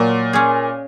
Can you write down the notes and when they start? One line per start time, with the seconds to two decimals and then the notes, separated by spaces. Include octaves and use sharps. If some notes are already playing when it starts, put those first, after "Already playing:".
Already playing: A#2 F#3
0.33 C#4 G#4